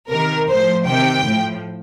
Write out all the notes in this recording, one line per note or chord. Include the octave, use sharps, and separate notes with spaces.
C3 D#3 A#4
A2 F3 C5
C3 D#3 G5
A2 F3